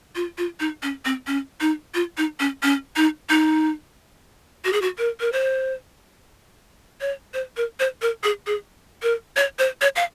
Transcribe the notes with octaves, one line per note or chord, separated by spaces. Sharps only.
F4
F4
D#4
C#4
C4
C#4
D#4
F4
D#4
C#4
C#4
D#4
D#4
F#4
G#4
F#4
A#4
A#4
C5
C#5
C5
A#4
C5
A#4
G#4
G#4
A#4
C#5
C5
C#5
F5